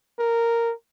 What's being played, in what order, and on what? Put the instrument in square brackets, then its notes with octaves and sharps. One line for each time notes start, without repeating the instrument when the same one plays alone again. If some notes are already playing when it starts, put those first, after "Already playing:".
[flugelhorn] A#4